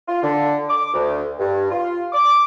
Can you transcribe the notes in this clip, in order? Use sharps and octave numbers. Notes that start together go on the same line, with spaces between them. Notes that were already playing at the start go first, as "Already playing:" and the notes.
F4
D3
D6
D2
G2
F4
D6